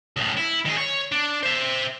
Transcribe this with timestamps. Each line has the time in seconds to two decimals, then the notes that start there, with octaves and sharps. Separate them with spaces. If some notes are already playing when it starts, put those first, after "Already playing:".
0.17 C#2 A2
0.37 E4
0.66 D#3 G#4
0.77 C#5
1.12 D4
1.43 C5 E5